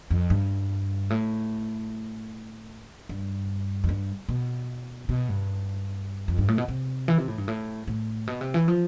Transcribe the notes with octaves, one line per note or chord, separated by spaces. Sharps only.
F2
G2
A2
G2
F2
G2
B2
B2
G2
F2
G2
A2
B2
C3
E3
C3
A2
G2
A2
A2
B2
C3
E3
F3